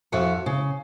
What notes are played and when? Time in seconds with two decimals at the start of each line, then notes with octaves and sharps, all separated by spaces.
0.12 F2 F#4 E5
0.46 C#3